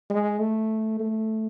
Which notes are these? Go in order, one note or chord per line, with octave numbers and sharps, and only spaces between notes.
G#3
A3
A3